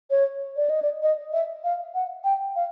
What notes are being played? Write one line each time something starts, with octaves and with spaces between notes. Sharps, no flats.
C#5
D5
D#5
D5
D#5
E5
F5
F#5
G5
F5